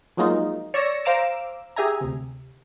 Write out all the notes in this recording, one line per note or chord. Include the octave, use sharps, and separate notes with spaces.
F3 F#3 G#3 A#3 D#4 F4
C#5 D5 C#6 E6 A#6 C#7
C5 F5 A#5 D6 E6
G4 G#4 E5 G#5 A#5
D2 C3